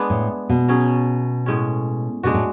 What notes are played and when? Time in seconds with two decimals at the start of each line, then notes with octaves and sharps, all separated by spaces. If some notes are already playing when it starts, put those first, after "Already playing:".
Already playing: G#3 B3 D4
0.10 A2
0.49 B2
0.68 F#3 C#4 G#4
1.46 A2 G#3 C#4
2.23 B2 G#3 D4 F#4
2.34 A2